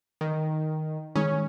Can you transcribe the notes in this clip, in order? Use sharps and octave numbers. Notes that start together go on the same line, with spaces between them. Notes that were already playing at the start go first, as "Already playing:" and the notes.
D#3
D#3 G#3 C#4